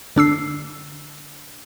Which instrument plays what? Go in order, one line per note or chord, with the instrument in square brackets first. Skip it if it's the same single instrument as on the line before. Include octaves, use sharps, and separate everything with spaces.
[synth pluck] D3 D4 E6 C7